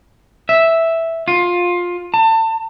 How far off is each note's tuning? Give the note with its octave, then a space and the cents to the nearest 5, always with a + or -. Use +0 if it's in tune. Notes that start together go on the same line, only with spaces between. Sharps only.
E5 -5
F4 +15
A5 +30